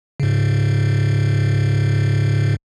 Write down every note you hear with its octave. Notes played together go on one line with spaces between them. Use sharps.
G#2 C#3